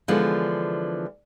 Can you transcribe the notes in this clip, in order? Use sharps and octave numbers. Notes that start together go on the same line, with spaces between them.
D3 E3 F3 G#3 B3